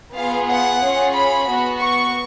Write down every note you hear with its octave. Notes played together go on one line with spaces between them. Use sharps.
B3 F4 G#4 F5
F#5
C#4 F4 G#4
B5
B3 F#4
C#6